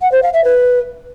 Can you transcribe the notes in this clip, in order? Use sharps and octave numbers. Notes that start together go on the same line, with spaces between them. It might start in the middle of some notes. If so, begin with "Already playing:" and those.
F#5
C5
F5
E5
B4